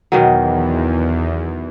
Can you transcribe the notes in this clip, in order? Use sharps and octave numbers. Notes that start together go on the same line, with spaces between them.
E2 B2 D#3 F#3